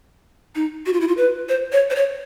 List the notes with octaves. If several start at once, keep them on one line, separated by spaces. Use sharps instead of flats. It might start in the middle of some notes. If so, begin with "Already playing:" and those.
D#4
F#4
F4
E4
F4
B4
C5
C#5
C5
C#5